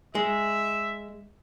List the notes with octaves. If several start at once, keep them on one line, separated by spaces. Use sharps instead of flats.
G#3 E5